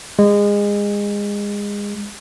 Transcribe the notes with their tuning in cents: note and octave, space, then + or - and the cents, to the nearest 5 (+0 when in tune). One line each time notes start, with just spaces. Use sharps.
G#3 -25